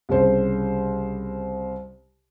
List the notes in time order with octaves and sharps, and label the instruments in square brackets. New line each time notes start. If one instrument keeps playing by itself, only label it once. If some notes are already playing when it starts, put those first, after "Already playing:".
[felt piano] C2 C#3 C5